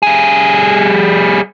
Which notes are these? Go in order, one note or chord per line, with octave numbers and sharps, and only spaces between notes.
G3 G#4